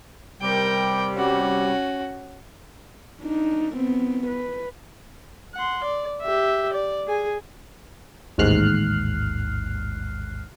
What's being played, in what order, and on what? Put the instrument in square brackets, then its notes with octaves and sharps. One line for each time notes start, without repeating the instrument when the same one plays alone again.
[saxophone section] C3 G3 [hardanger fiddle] A#4 G5
[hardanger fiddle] C#4 F#4
[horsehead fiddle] D4 D#4
B3 C4
B4
[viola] F#5 C6
D5
G4 E5
D5
G#4 G#5
[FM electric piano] A1 D#2 G#2 F6 F#6 C7